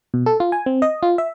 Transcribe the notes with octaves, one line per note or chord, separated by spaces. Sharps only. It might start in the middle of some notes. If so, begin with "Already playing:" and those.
B2
A4
F4
G#5
C4
D#5
F4
E5